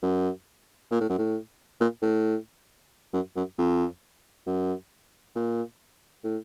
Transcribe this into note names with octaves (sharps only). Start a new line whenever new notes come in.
F#2
A#2
A2
F#2
A2
A#2
A2
F#2
F#2
F2
F#2
A#2
A2